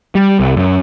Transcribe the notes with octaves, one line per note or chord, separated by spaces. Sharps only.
G3
C2
F#2